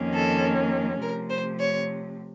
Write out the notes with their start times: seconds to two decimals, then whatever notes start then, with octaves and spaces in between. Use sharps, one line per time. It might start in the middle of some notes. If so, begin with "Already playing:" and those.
Already playing: F2 D#3 A#3 C#4
0.15 A4
1.01 C3 F3 A3 A#4
1.30 C5
1.59 C#5